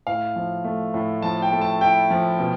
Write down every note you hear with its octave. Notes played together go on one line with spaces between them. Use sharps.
A2 F5
F3
A3
A2
F3 A5
G5
A3
A5
E4 G5
F3
B2